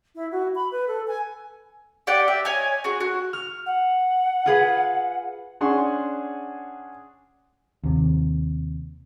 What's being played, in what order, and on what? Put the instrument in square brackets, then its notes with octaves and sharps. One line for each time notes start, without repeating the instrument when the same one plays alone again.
[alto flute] E4
F#4
B5
B4
A4
G#5
[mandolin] G4 D5 F#5 G5
E5
C#5 D#5 G#5
F#4 G#4
F#4
[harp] F6
[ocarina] F#5
[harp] F4 G#4 B4
[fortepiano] C#4 D4 G#4 F#5 C6 C#6
[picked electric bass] D#2 C3